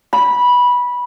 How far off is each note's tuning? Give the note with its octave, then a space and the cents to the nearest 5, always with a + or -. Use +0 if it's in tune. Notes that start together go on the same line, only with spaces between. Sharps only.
B5 -15